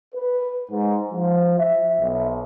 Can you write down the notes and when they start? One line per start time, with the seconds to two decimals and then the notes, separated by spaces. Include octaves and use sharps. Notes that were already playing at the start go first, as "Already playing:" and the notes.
0.15 B4
0.71 G#2
1.12 F3
1.58 E5
1.99 B1